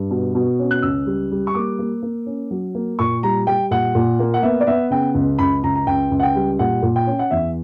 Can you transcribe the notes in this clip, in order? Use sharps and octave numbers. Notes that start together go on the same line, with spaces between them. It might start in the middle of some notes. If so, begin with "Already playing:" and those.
Already playing: G2
B2
B2
C#4
F#6
C#2 E6
G3
G3
C#6
A#3 D6
A#3
A#3
C#4
F#3
A#3
A#2 C#6
G3 A#5
G3 G5
A#2 F#5
A#2
A#3
F#5
B3 E5
D5
B3 E5
C#3 G5
C#2
C#2 B5
C#2 A#5
A#5
C#2 G5
C#2
F#5
G5
G3
A#2 F#5
A#2
G5
C#4
F#5
E2 E5